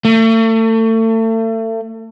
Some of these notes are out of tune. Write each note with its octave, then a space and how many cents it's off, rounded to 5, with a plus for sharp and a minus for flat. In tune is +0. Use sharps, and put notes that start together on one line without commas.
A3 +35